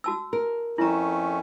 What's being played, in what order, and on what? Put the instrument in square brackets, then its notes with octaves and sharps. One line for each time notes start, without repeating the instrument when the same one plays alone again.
[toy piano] F#4 A5 E6
[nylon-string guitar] A#4
[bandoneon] F2 A3 C#4 [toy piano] E4 A#5